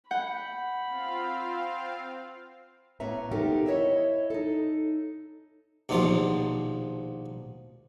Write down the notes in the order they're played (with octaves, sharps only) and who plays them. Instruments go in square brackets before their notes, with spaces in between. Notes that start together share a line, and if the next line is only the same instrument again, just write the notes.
[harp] F#5 G6 [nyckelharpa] B5
[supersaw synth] C4 F4 F5
[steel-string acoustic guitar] A2 A#3 B3 C#4 E5 A#5
B3 C4 D#4 G4 A4 A#4
E4 C#5 D#5 E5
D#4 A4
[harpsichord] A#1 D#2 B2 F3 F4